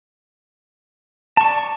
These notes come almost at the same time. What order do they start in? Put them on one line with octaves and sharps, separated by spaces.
A5 C#6 D5